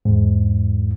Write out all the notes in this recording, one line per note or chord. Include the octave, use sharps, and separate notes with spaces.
E2 G#2